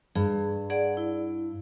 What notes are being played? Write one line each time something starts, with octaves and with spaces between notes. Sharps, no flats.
G2 G#4
G#4 D5 F#5
E4